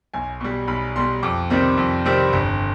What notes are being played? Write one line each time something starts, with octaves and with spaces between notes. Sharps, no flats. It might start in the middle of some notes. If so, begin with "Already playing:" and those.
B1 G#5
B2 G3
B1 B5
B2 G3 C6
F2 D6
C3 D#3 G3 C4
F2
C3 D#3 G3 C4
G1